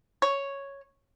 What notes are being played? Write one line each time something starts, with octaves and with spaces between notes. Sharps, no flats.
C#5